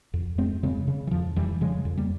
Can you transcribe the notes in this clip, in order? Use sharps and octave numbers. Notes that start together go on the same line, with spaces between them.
F2
F2 G#3 C4
C#3 G#3 C4
C#3
E3
F2 F3
F2 E3 G3
C#3 F3 G#3
F2
G3 A#3